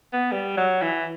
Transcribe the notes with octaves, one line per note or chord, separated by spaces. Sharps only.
B3
G3
F#3
E3